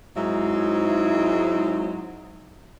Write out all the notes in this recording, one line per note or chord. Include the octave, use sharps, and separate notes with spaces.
G#2 F#3 G#3 C4 D#4 E4